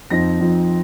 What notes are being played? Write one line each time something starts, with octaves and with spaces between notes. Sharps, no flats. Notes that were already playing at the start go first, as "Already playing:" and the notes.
F2 F3 C4 D#4 A#6
F2 F3 C4 D#4